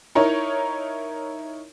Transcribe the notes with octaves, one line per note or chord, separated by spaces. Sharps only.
D#4 E4 A#4 C#5